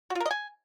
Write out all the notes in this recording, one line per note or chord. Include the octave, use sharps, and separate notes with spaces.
F#4
F4
A#4
D#5
G#5